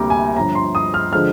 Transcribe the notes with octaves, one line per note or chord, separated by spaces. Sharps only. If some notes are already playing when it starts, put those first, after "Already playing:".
Already playing: D2 C3 G3 A#3 A#5 D6
G#5
G1 G2 F3 A#5
C6
D#6
F6
D3 F3 G#3 F6